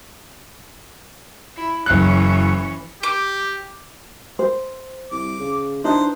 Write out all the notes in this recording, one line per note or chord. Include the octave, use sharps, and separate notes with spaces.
E4
F#1 E3 C#4 F#6
G4 D6
C5
C2 D6
C#3
E3 D4 D#4 B4 C5